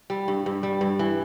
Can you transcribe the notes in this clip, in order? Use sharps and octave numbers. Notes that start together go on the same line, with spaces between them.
G3
G2
G2
G3
G2
E3